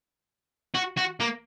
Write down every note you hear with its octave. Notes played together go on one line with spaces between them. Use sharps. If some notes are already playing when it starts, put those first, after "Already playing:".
F#4
F#4
A#3